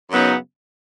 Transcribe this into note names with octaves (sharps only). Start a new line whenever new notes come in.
F#2 C#3 F#3 B3 D#4